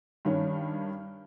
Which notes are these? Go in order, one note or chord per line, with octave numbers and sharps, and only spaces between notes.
G2 D#3 C#4